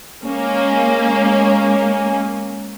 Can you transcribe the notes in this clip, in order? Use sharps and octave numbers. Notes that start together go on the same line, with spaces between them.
G#3 A#3 C#4